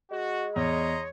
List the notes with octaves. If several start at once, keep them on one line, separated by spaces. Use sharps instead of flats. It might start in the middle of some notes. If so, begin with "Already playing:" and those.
G#3 F#4
E2 C#5 D#5 A#5 C6